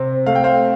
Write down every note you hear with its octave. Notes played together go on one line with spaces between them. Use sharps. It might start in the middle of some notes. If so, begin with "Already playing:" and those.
Already playing: C3 C4
A3 F5
G5
C5 F5